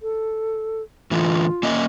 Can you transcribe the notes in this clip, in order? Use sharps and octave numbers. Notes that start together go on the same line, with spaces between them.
A4
A2 D3 E3 F4
A#3 C#4 D#5